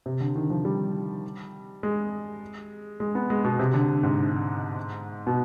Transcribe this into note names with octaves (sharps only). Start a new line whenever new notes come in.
C3
D3
D#3
F3
G3
G#3
G#3
B3
G#3
B2
C3
D3
G#2
B2